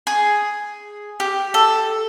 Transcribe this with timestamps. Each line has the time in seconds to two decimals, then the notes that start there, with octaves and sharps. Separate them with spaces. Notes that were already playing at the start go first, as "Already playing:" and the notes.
0.07 G#4
1.20 G4
1.54 A4